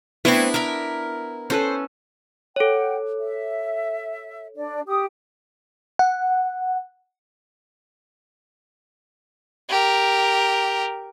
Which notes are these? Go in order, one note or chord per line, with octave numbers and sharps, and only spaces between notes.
A3 B3 C4 D4 E4
A#4 E5 D6
C#4 A4 B4 C5
A4 C#5 F#5 G5
E5
D4 D5
G4 D#6
F#5
G4 A#4